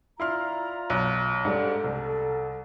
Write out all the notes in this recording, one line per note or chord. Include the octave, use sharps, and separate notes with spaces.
E4 F4 D5 A#5 C6 F6
B1 F#6
G#2 G3 D4 A4
C2